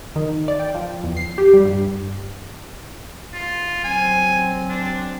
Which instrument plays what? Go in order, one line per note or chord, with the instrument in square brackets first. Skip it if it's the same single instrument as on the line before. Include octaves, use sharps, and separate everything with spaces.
[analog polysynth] D#3
D5
G5
F3
E2
C7
G4
G3
G2
[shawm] F4
[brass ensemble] F#3 C4 [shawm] G#5
[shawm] D4